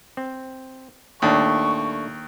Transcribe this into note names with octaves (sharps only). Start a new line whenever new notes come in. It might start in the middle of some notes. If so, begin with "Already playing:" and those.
C4
D#2 A#2 A3 D4 C#6